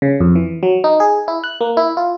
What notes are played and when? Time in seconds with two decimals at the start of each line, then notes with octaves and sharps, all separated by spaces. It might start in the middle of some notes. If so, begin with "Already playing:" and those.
0.02 C#3
0.20 F2
0.35 E3
0.63 F#3
0.84 D#4
1.00 G#4
1.28 E4
1.44 F#6
1.61 A#3
1.77 E4
1.97 F4